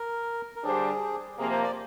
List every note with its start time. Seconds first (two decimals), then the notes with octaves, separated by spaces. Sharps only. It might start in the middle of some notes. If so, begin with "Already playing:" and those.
Already playing: A#4
0.56 A#4
0.64 D3 G3 D4 G4 G#4 C5
1.38 C3 F3 A#3 G#4
1.51 C5
1.63 D5